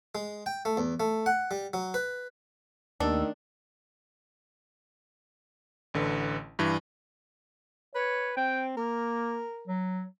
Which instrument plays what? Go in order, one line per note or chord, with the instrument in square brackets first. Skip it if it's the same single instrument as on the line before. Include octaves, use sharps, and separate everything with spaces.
[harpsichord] G#3
G5
A3
E2
A3
F#5
G3
F#3
B4
[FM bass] D#2 [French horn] D#3 [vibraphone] A3 E6 [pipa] D4
[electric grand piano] A1 D3 B4
G2 E3
[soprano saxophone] B4 [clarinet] C#5
[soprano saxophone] C4 [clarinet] G5
[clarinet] A#3 [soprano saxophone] A#4
[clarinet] F#3